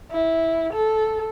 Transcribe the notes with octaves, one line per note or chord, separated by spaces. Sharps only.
E4
A4